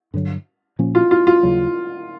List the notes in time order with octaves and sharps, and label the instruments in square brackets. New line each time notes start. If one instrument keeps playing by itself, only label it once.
[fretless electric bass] G2 D3 F#3
A#2 F3 A#3 C#4
[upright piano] F4
F4
F4
[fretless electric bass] D#2 C#3 F#3